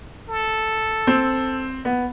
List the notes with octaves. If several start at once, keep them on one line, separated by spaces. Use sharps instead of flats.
A4
C4
B3